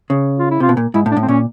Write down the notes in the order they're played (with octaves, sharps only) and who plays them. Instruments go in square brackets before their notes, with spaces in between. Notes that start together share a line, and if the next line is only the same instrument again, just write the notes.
[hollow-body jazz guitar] C#3
[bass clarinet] F4
E4
[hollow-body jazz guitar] C3 [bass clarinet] F4
[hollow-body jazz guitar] B2
A#2
[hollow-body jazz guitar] G#2 [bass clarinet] E4
[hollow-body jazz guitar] A2
[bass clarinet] D4
[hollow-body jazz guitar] A2
[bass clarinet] C4
[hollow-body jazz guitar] A#2 [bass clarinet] C#4